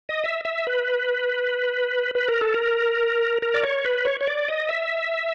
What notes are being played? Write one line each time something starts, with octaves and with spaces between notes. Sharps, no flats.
D#5
E5
E5
B4
B4
A#4
A4
A#4
A#4
D5
C#5
B4
C#5
C#5
D5
D#5
E5